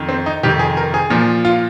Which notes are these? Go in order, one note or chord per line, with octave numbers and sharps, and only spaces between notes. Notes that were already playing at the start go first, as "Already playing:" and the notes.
Already playing: F2 D#3
C4
D#4
F2 C3 D#3 G4
G#4
A#4
G#4
A#2 F3
F4